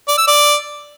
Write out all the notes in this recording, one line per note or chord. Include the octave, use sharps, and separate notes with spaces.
D5
E6
D5